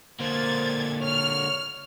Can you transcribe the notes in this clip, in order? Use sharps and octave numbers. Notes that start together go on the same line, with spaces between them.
D3 A#3 C5 G#6 A6
C#5 F6